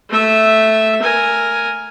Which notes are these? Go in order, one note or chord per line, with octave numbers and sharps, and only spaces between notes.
A3 E5
A#4 G#5